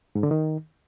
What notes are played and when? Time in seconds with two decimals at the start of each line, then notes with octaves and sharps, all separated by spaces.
0.15 G#2
0.23 D3
0.31 D#3